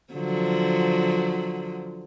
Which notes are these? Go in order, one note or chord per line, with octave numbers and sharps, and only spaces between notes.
D3 F3 F#3